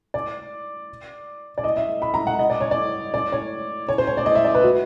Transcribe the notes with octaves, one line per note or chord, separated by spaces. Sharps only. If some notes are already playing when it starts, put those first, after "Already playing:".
D5
D5
D#5
E5
B5
A#5
F#5
D#5
D5
C#5
D5
D5
C#5
C#5
C5
C#5
D5
D#5
E5
D5
B4
F#4